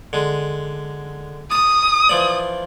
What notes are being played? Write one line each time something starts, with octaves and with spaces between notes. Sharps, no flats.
D3 G#3
A5 D#6
E3 F3 D5